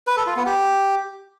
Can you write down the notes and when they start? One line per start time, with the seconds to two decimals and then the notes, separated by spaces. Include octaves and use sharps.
0.07 B4
0.17 A4
0.27 F4
0.36 B3
0.46 G4